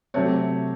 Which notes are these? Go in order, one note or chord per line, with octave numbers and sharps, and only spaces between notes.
C3 F#3 A3 C4 C#5